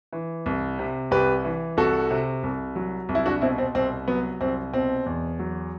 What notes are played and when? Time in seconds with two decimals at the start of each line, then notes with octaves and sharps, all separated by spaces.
0.13 E3
0.46 C2
0.79 C3
1.11 C2 G4 B4
1.44 E3
1.77 C2 F#4 A4
2.10 C3
2.43 C2
2.76 F#3
3.09 C2
3.15 E4
3.26 D4 F#4
3.41 B2 C4 E4
3.58 C4
3.75 C2 C4
4.08 F#3 B3
4.41 C2 C4
4.73 B2 C4
5.06 E2
5.39 F#3